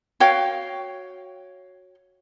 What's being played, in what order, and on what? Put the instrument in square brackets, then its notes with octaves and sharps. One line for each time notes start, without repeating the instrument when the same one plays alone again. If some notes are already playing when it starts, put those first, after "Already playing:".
[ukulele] F#4 C#5 F5 G5